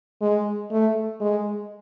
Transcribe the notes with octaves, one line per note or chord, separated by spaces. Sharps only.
G#3
A3
G#3